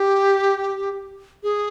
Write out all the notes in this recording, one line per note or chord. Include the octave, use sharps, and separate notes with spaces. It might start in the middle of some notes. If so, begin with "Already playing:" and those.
Already playing: G4
G#4